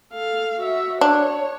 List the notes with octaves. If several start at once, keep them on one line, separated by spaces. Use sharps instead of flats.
A4 F5
F#4 E5
D4 C#5